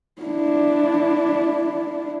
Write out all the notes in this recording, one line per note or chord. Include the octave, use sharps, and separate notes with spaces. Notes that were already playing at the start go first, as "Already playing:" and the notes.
D4 E4